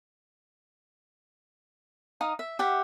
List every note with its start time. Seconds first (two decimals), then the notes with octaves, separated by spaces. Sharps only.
2.21 D#4 F5 D#6
2.39 E5
2.59 G4 E5 F#5